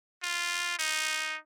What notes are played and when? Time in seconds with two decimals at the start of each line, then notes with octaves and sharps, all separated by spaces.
0.23 F4
0.78 D#4